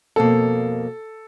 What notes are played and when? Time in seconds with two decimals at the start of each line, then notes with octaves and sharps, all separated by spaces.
0.16 F2 B2 A#3 A4